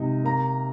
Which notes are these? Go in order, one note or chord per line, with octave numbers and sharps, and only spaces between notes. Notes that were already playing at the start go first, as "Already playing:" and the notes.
Already playing: C3 G#3 D#4
A#3 A#5